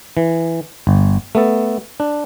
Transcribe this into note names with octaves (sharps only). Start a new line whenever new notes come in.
E3
G1
A3 B3 A4
D4